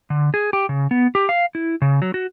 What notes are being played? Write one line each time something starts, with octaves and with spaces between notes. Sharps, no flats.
D3
G#4
G4
C#3
B3
G4
F5
E4
C#3
F#3
F#4